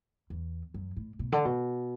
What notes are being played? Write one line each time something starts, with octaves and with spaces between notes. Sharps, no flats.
E2
F#2
A2
B2
D3
B2